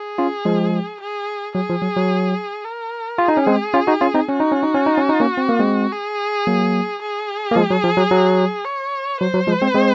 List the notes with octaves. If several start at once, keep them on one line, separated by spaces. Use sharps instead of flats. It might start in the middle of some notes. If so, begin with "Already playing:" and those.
Already playing: G#4
C#4 F4
F3 G#3
G#4
F#3 G#4
F3
F#3
F#3
A#4
F4 G#4
D#4
C#4
G#3 C4
C#4 F4
D#4 F#4
C#4 F4
C4 D#4
C#4 F#4
D#4
C#4
D#4
C#4
D#4
C#4
D#4
A#3 C#4
C4
A#3
G#3 C4
G#4
F#3 A#3
G#4
A#3
F3 G#3
F#3
F3
F#3
F#3
C#5
F#3 C5
F#3
F3 G#3
G#3 C4
G#3 C4